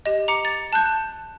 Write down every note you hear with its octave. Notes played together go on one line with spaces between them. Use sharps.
G4 D#5
A#5 D6 C#7
A6
A5 F#6 G6